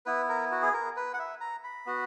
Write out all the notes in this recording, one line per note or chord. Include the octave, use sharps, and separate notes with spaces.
B3 E4 B4
A#4
F#4
G#4
A#4
B4
F#5
E5
A#5
B5
B3 F#4